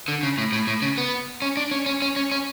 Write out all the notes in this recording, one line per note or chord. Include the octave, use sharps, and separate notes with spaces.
D3
C#3
A2
A2
A2
C#3
B3
C#4
D4
C#4
C#4
C#4
C#4
C#4